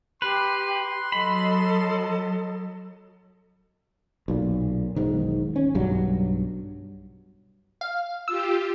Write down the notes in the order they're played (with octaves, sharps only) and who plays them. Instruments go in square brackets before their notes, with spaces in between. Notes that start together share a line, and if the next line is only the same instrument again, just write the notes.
[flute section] G4 [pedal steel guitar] B4 [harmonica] C6
[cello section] F#3 [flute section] A4 D#5 [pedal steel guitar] B5
[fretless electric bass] B1 A#2
E1 B1 G#2 D#3
C#4
B1 G2 F#3 G3
[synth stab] F5
[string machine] F4 G4 [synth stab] E6